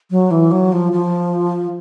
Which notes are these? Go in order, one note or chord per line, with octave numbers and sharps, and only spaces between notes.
F#3
E3
F#3
F3
F3